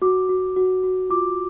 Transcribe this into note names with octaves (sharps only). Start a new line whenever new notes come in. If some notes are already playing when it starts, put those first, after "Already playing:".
F#4 D6
F#4
F#4
F#4
F4 D6